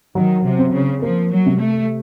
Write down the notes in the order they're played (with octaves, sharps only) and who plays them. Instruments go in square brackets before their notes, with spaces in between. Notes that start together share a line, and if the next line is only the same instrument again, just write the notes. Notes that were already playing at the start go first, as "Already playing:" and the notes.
[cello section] D#3 [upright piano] F#3
[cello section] C3
[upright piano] C4
[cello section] C#3
[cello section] F3 [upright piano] A#3
[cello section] F#3
[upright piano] C3
[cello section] A3